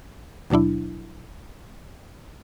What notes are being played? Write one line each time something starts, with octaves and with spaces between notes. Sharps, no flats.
D#2 B2 F#3 D4 E4